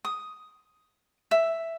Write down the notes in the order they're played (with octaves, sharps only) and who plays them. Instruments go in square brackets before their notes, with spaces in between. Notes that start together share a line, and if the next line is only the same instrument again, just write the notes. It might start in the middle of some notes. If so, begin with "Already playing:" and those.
[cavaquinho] D#6
E5